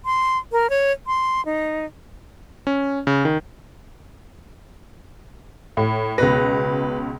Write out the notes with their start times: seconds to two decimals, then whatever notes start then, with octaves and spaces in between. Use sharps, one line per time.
0.05 C6
0.52 A#4
0.70 C#5
1.07 C6
1.45 D#4
2.67 C#4
3.07 C#3
3.25 D#3
5.77 A2
6.18 C#2 B2 B4 A#6